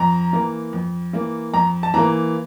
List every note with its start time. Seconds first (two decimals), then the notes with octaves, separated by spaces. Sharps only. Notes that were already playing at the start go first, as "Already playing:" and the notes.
Already playing: F2 A#5
0.33 E3 A#3
0.73 F2
1.13 E3 A#3
1.54 F2 A#5
1.83 A5
1.94 E3 A#3 A#5